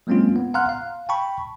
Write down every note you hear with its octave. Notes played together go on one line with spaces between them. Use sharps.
F#3 G#3 A#3 C4 C#4 F4
B3
F5 F#5 A#5 C6 F6 F#6
F5
G5 A5 B5 C#6